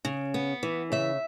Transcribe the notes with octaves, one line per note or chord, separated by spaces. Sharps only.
C#3
B3
E3
C#3 E5